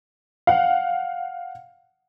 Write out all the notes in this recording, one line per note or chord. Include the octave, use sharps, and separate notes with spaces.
F5 F#5